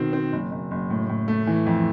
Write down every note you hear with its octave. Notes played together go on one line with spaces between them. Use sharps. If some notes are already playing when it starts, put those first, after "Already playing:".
Already playing: B2 D#3 C4
C4
F#1
F#1
F#1
A2
A2
A3
E3
F2